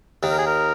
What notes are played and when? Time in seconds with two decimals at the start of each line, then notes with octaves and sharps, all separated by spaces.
0.23 D#2 D#3
0.31 A#4
0.38 G#4
0.47 A#4